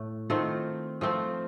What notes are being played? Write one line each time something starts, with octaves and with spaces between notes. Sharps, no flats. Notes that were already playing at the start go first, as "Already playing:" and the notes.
Already playing: A2 A3
D#3 A3 C4 F4
F3 A3 C4 F4